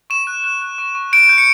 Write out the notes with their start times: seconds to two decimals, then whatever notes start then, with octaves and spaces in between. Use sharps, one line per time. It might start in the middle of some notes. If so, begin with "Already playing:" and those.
0.10 C#6 E7
0.27 F#6
0.44 F#6
0.62 F#6
0.78 C#6
0.95 C#6
1.12 G6 D7
1.29 G6
1.38 C#7